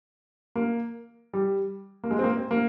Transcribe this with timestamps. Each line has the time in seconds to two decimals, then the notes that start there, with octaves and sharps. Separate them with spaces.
0.55 A#3
1.33 G3
2.04 A#3
2.11 G#3
2.19 C4
2.24 A#3
2.37 C4
2.51 A#3